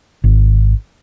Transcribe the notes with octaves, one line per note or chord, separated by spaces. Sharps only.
G#1